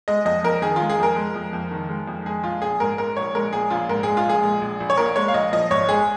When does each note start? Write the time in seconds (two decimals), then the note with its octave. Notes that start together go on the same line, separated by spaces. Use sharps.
0.08 G#3 D#5
0.25 F2 D#5
0.44 F2 A#4
0.62 D#3 G#4
0.76 G#3 F4
0.90 G#4
0.99 F2 A#4
1.16 G#3
1.35 F2
1.53 F2
1.71 D#3
1.89 G#3
2.08 F2
2.26 G#3 G#4
2.44 A#1 F4
2.62 A#1 G#4
2.80 G#2 A#4
2.98 G#3 A#4
3.17 A#1 C#5
3.35 G#3 A#4
3.53 A#1 G#4
3.70 A#1 F4
3.89 G#2 A#4
4.03 G#3 G#4
4.17 F4
4.26 A#1 G#4
4.43 G#3
4.61 A#1
4.80 A#1
4.90 C#5
4.97 A#2 A#4
5.16 G#3 C#5
5.28 F5
5.34 A#1 D#5
5.53 F3 D#5
5.71 G#1 C#5
5.89 G#3 G#4